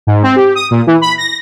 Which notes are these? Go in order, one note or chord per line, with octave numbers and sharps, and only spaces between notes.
G#2
C4
G4
D#6
A#2
E3
B5
A#6